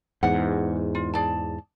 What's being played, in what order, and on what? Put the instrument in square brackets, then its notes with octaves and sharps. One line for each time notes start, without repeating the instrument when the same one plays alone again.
[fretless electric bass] E2 G#2 [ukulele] F#5
[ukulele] F4
G#4 D5 A5